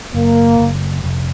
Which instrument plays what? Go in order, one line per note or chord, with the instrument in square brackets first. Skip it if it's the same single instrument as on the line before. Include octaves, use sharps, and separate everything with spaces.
[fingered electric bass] F#1 [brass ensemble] A#3
[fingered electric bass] F#1
F1